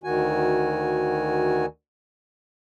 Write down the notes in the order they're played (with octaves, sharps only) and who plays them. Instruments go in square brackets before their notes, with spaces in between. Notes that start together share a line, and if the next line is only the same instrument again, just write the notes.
[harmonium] D2 D#3 F#4 G#5